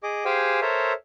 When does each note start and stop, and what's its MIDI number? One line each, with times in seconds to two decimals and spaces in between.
0.03 0.24 68
0.03 0.24 75
0.03 0.24 86
0.25 0.60 67
0.25 0.60 68
0.25 0.60 72
0.25 0.60 77
0.25 0.60 79
0.25 0.60 80
0.62 0.93 69
0.62 0.93 70
0.62 0.93 72
0.62 0.93 73
0.62 0.93 76